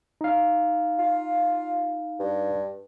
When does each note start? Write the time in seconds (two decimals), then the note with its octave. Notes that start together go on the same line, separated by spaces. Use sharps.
0.21 D#4 F5
0.99 F4
2.20 G2